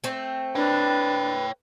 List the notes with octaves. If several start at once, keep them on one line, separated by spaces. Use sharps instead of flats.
A3 C4
D4 B4 C#5 G5